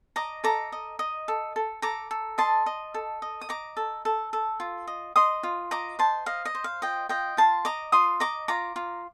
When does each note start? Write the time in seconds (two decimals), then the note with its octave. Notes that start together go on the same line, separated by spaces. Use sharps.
0.16 D#5 A#5 D6
0.44 A4 A#5 D6
0.72 D#5
0.99 D#5
1.28 A4
1.56 A4
1.82 A4 A#5 D6
2.11 A4
2.38 D#5 A5 C6
2.66 D#5
2.94 A4
3.22 D#5
3.41 D#6
3.49 D#5 A#5 D6
3.77 A4
4.05 A4
4.33 A4
4.60 F4
4.87 D#5
5.16 D#5 C6 D#6
5.43 F4
5.71 D#5 A#5 D6
5.99 C5 A5 C6
6.26 D#5 F5
6.45 D#5
6.55 C5
6.64 F5
6.82 F4 D#5 G5
7.09 F4 D#5 G5
7.37 F4 A5 C6
7.65 D#5 A#5 D6
7.92 F4 C6 D#6
8.20 D#5 A#5 D6
8.48 F4 A#5 D6
8.76 F4